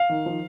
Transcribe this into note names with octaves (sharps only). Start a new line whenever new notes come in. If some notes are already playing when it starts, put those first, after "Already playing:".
Already playing: F5
D#3
F3